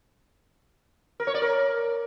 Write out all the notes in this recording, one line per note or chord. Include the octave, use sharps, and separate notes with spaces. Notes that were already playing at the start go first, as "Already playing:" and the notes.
A#4
C#5
D5
A#4